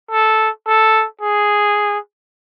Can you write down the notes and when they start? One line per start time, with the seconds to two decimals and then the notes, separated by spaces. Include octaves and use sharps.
0.11 A4
0.67 A4
1.21 G#4